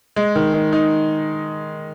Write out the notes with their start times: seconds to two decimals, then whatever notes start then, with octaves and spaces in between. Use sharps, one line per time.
0.16 G#3
0.36 D#3
0.54 D#3
0.72 D#4